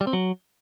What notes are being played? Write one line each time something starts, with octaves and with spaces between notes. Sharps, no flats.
G3
C4
F#3